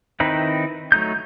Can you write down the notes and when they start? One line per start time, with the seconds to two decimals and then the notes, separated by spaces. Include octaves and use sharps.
0.20 D#3 C4 D#4 E4 B4
0.92 F#3 A3 D#4 G6